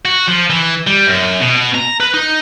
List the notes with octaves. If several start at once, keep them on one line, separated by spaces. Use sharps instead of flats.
F#4
F3
E3
G3
F#2
B2
A#5
B4
D#4